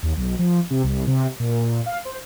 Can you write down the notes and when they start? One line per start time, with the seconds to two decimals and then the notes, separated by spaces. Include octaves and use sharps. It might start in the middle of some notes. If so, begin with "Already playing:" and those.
0.03 D#2
0.17 B1
0.39 F3
0.70 C3
0.83 C2
1.07 C3
1.40 A#2
1.86 F5
2.05 C5